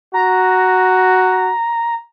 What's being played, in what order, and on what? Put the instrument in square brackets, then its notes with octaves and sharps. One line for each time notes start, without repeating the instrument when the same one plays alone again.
[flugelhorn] F#4 [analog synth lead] A#5